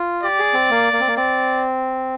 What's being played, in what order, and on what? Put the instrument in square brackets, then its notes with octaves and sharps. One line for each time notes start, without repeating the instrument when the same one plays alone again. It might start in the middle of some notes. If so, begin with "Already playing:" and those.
Already playing: [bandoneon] F4
[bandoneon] G4 [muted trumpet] D5
[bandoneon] G#4
C4
A#3
A#3
C4
A#3
[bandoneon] C4 [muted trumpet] D5